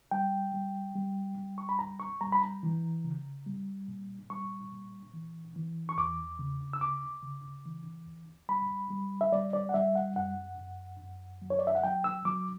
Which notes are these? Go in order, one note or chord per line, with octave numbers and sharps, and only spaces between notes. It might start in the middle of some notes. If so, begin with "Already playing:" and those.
G3 G5
G3
G3
G3
C#6
B5
C#2 A#5
C#6
G3 A#5
B5
A#5
E3
C#3
G3
A#2
G3 C#6
A#2
E3
E3
C#6
E2 D6
C#3
E6
D2 D6
C#3
E3
D2
G3 B5
G3
E5
G3 D5
D5
F#5
G3 E5
F#5
F#2 F#5
F#2
F#2
F#3
C#5
D5
E5
F#5
F#3 G5
E6
F#3 D6